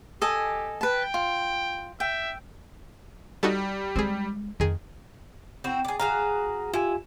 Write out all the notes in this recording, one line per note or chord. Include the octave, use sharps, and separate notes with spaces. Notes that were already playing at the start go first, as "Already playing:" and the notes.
G4 A4 D#5 G#5
B4 G5 A5
F4
E5 G5
G3 D#4 F#4 A4
G#3 C4 G#4
F2 D#3 G#4
C4 E4 F#4
G#4 D5
F#4 G#4 F5 A#5
E4 F4 G4 G#5